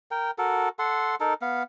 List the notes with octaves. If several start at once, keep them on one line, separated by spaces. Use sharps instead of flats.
A#4 G5
F#4 A4 A#4
A4 F#5 C6
D#4 A4 A#4
B3 F5